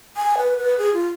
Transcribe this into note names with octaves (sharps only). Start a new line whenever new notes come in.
G#5
B4
B4
G#4
F4